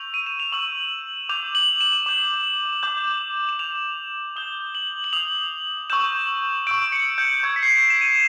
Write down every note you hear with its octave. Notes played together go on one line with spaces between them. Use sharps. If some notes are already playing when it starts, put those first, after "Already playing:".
Already playing: C#6 E6 G6 F7
D#7
E7
F7
C#6 E6 G6 F#7
D6 G6 F7
F#7
E7
D6 G6
D6 G6
E7
D6 G6 F7
D#6 G6 G7
F#7
F#7
D#6 G6 F7
C#6 E6 G6 E7
C#6 E6 G6 D7
C#7
G6
C#6 E6 G6 G#6
B6
C7
E7
D#7